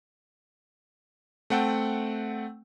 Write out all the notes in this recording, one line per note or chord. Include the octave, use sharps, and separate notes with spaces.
A3 C4 F#5 G5 A5